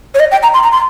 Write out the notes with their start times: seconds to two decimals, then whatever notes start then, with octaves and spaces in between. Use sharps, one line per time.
0.15 C#5
0.20 D#5
0.31 G5
0.43 A#5
0.54 C6
0.63 A#5
0.72 C6